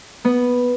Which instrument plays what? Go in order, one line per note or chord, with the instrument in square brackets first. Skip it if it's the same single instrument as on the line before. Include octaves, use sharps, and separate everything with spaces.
[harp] B3